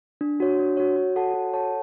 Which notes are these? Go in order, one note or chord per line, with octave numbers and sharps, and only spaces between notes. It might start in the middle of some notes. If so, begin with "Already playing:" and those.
D4
F#4 C#5
D4
F#4 C#5
F#4
A4 C#5 F#5 A5
F#4
A4 C#5 F#5 A5